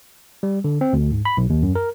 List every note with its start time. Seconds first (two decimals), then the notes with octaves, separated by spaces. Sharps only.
0.43 G3
0.64 D3
0.81 C4
0.93 D2
1.12 G#2
1.25 B5
1.37 B1
1.50 D#2
1.63 F#2
1.75 A#4